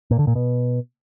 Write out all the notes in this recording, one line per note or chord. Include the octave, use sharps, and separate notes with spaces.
A#2
D3
A#2
B2